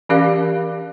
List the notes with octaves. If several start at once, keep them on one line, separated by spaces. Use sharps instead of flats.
E3 C#4 G4 A#4 D5 F5